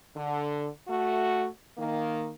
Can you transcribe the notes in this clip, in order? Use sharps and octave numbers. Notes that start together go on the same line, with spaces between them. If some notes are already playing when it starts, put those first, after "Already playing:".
D3
A3 F#4
D#3 A#3